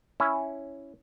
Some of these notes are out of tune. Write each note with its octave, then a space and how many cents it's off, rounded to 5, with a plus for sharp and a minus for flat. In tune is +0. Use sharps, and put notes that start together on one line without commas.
C#4 +0 E4 +0